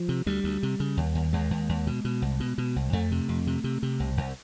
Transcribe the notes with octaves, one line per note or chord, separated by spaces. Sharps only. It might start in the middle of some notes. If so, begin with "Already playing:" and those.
Already playing: F3
C3
D2 G3
D2
C3
C#3
D#2
D#2
D#2 G#3
D#2
D#2
B2
B2
C2
B2
B2
C2
F2 A3
C3
F2
C3
C3
C3
C2
C2